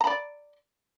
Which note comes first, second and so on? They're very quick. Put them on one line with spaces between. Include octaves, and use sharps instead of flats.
A#5 B5 D5